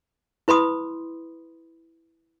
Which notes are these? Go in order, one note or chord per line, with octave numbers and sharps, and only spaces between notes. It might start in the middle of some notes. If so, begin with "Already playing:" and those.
E4 B4 B5 C6 D#6